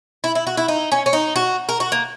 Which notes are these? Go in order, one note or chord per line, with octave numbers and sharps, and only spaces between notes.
E4
E4
F#4
E4
D#4
C#4
C#4
D#4
F#4
A#4
F#4
A#3